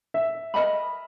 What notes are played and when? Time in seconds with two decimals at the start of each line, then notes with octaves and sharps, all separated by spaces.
0.14 E5
0.54 A#4 D#5 G#5 B5